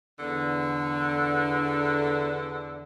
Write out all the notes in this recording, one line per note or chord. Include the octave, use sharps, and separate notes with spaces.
E2 D3